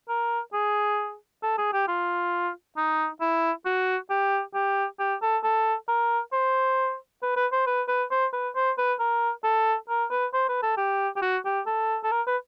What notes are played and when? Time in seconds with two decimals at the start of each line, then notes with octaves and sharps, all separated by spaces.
0.09 A#4
0.53 G#4
1.43 A4
1.58 G#4
1.73 G4
1.88 F4
2.77 D#4
3.21 E4
3.66 F#4
4.10 G4
4.54 G4
4.99 G4
5.22 A4
5.43 A4
5.88 A#4
6.33 C5
7.22 B4
7.36 B4
7.52 C5
7.67 B4
7.88 B4
8.11 C5
8.33 B4
8.56 C5
8.78 B4
8.99 A#4
9.44 A4
9.89 A#4
10.11 B4
10.34 C5
10.49 B4
10.63 A4
10.77 G4
11.17 G4
11.22 F#4
11.45 G4
11.66 A4
12.04 A4
12.12 A#4
12.27 B4